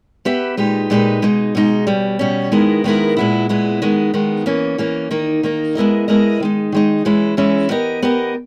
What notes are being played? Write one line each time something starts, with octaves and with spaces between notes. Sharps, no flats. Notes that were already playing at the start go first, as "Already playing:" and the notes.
B3 G4 B4 E5
A#2 G#3 D#4 G4 B4
A#2 G#3 D#4 G4 B4
B2 G#3 D#4
B2 G#3 D#4
B2 G3 C#4
B2 G3 C#4
D#3 G#3 B3 E4 A#4
D#3 G#3 B3 E4 A#4
A#2 G#3 B3 E4
A#2 G#3 B3 E4
D#3 G#3 B3
D#3 G#3 B3
E3 A#3 C#4
E3 A#3 C#4
D#3 A#3 D#4
D#3 A#3 D#4
G#3 B3 E4 A#4 D#5
G#3 B3 E4 A#4 D#5
D#3 G#3 D#4
D#3 G#3 D#4
E3 G#3 C#4 E4
E3 G#3 C#4 E4
B3 G4 A#4 D#5
B3 G4 A#4 D#5